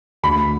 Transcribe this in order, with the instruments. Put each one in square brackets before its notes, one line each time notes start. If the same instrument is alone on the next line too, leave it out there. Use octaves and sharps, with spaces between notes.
[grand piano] D2 [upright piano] B5